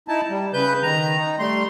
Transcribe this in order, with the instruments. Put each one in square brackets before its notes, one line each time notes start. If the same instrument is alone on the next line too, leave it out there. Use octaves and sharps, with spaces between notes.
[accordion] D#4 E4 A5
G3
C#3 B4 G6
D#3 A#5
D#4
G3 A3 C6